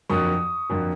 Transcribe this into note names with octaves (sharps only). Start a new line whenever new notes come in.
F2 D3 F#3 A#3 C#6 D#6
F2 D3 F#3 A#3